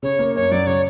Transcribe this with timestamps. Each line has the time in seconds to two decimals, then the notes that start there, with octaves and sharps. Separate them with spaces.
0.03 C#3 C#5
0.19 A#3
0.35 F#2 C#5
0.51 F#3 D5
0.67 C#3 C#5